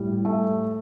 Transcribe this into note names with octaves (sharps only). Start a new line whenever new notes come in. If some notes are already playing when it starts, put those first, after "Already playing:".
Already playing: A2 G3
A3